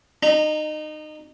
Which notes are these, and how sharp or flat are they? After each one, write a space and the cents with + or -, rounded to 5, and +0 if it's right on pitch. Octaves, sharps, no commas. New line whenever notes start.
D#4 -25 A#5 +0